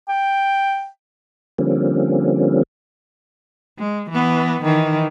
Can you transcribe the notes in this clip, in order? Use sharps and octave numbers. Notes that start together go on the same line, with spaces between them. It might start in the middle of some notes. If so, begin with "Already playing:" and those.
G5
D3 F3 G3 A#3 C4 C#4
G#3
E3 B3
D#3 E3